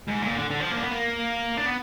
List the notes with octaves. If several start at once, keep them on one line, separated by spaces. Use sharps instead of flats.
G#2
A#2
D3
D3
F3
A#3
D4
B3
A#3
D4
B3